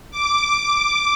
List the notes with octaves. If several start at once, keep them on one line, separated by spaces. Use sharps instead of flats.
D6